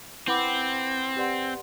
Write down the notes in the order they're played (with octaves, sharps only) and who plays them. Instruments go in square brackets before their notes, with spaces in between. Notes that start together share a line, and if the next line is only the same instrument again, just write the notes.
[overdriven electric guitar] C4 [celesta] E4 B4 F#5 B5 D6
[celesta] G4 B4 D5 F#5 C6